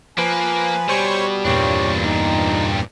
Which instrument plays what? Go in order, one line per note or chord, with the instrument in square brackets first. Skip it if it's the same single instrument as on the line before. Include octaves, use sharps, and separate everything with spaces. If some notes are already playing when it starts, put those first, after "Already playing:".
[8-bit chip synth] F3 B4 [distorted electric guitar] A#3 [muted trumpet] G#5
[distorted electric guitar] B2 [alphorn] G3 [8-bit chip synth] C5 C#5 C#6
[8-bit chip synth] E2 G2 A#2 [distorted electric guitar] C4 D4 [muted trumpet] C#5
[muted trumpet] D#4